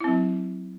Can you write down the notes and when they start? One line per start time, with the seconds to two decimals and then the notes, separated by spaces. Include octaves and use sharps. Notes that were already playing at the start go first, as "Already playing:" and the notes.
0.01 E4
0.04 C4
0.08 F#3